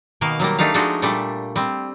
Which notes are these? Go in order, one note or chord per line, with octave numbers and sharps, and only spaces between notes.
B2 D#3 A#3 F5
F#3 G3 A#3
A3 D4 D#4 G4 F5
F3 G#3 A3 D4 D#4 F#4
A#2 G3 A3 D4
G3 C4